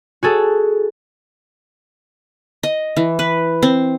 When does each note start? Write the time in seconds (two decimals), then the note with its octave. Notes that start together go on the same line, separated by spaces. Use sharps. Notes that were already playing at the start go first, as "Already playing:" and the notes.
0.23 F#4 G#4 A4
2.63 D#5
2.97 E3
3.19 B4
3.63 C4